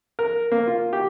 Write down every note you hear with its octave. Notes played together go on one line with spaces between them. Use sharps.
A#4
A#3
F4
G4